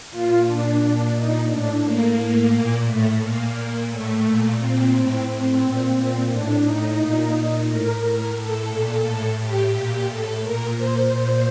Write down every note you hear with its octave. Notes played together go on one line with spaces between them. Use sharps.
A#2 F4
A#2 D4
A#2 D4
A#2 D#4
A2 D4
A2 A#3
A2
A#2
A2 A3
A#2 A#3
A#2
A2 A3
A#2
A#2 C4
A2 C4
A2 C4
A#2
A#2
A2 D4
A2 D#4
A#2
A#2
A2 A#4
A2 A#4
A2 A4
A#2
A2
A2 G4
A#2 G4
A2 A4
A#2 A#4
A#2 C5
A#2